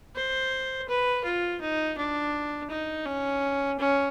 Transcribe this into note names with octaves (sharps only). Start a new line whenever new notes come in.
C5
B4
F4
D#4
D4
D#4
C#4
C#4